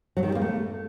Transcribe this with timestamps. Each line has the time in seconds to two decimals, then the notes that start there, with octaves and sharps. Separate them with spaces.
0.17 F#3
0.23 D#3
0.29 G3
0.35 A#3
0.42 A3